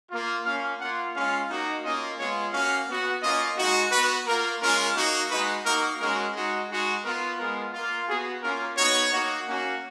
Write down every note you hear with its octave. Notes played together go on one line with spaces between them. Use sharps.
A#3 F4
A#3 C#4 F4 F5
A#3 F4 F#5
G#3 C#4 F4 F5
A#3 D#4 F#4
A#3 C#4 F4 D#5
G#3 B3 F4 C#5
A#3 C#4 F#4 F5
B3 F#4
A#3 C#4 F4 D#5
G#3 D#4 F#4
B3 F#4 B4
A#3 F4 A#4
G#3 C#4 F4 A#4
A#3 D#4 F#4
G#3 D#4 F#4 B4
A#3 D#4 F#4 A#4
G#3 C#4 F#4 A#4
G#3 D#4 F#4
G#3 D#4 F#4
B3 F4 A#4
G#3 B3 F4 A#4
A#3 F4
B3 F#4 G#4
A#3 C#4 F4 A#4
B3 D#4 F#4 C#5
A#3 D#4 F#4
A#3 C#4 F#4